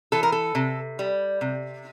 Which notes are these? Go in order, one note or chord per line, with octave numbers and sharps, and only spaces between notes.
E3 A4
A#4
A4
C3
G3
C3